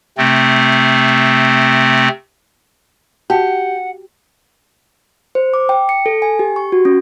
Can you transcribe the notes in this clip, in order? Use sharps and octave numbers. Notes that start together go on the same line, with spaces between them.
C3 A3 C4
F#4 G4 F#5 G5 A5
C5
D6
G5
C#7
A4
G#5
G4
C#6
F#4
C#4